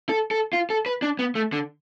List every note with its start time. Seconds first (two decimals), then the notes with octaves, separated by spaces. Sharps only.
0.09 A4
0.31 A4
0.53 F4
0.70 A4
0.86 B4
1.02 D4
1.19 B3
1.35 A3
1.53 D3